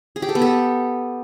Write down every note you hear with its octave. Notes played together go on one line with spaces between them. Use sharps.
G#4
G4
A4
B3
A4